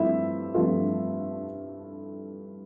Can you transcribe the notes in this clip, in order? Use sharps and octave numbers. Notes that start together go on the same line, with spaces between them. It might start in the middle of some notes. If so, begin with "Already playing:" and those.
Already playing: G2 F3 A3 C4 E4 F4 E5
G2 F3 A3 C4 F4